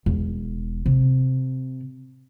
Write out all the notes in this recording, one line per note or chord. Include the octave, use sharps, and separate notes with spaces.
E1
C3